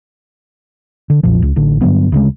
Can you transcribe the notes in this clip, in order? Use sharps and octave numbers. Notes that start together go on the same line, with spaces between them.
D3
B1 F2 A#2 F3
C#2
A1 D3
G2 D3 F#3 B3
D2 C#3 G#3